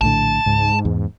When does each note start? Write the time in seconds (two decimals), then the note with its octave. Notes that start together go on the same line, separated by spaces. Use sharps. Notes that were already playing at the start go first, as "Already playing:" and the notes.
0.01 A#1 A2 D3 A5
0.46 C#2 G#2
0.85 E2